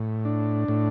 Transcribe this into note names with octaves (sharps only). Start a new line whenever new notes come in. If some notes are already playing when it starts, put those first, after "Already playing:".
Already playing: A2
D4
A2